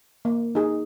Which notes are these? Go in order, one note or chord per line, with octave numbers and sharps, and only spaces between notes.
A#3
D#4 G#4